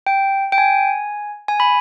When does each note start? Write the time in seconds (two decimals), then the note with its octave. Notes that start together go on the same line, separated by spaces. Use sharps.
0.07 G5
0.52 G5
0.58 G#5
1.48 G#5
1.60 B5